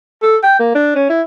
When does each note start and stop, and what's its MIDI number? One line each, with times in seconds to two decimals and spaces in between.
0.23 0.37 69
0.43 0.54 79
0.59 0.72 58
0.75 0.93 62
0.96 1.05 61
1.10 1.22 64